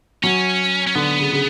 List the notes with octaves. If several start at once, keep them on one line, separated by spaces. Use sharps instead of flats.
F#3 C#4
C#4
D3 B3
C#3
C#3